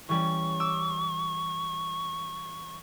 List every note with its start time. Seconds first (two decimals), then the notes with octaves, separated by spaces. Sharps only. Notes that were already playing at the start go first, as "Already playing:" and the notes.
0.09 E3 G3 C#4 C#6
0.60 D6 E6